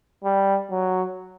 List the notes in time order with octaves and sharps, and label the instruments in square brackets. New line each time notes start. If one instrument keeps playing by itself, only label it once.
[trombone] G3
F#3